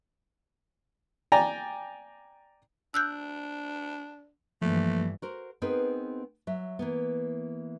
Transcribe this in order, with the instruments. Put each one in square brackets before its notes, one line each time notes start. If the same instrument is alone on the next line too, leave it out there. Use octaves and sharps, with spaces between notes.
[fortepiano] D5 G5 G#5 A#5
[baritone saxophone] D4 [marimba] E6 F#6 G6
[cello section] G2 E3 [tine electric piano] F3 A#3 [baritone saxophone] A3
[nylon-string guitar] F#4 A#4 C5
B3 C4 D#4 G#4 A#4 B4
F#3 E5
E3 A#3 B3